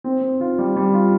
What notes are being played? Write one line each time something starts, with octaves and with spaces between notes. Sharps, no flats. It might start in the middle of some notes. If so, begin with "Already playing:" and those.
C4
C4
F4
G3
G3
F4